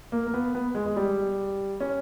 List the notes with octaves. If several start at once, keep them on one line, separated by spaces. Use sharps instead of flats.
A#3
A#3
B3
B3
G#3
G#3
G3
C#4